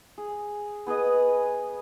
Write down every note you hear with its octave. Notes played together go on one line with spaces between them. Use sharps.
G#4
B3 G#4 B4 D#5